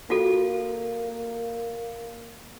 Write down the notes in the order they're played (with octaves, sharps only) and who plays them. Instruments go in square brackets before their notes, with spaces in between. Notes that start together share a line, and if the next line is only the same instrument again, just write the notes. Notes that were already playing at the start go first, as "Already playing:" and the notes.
[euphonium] A#3 [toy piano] F4 F#4 A4